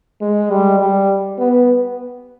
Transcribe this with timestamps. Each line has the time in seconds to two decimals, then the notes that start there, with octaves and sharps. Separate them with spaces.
0.21 G#3
0.50 G3
0.80 G3
1.38 B3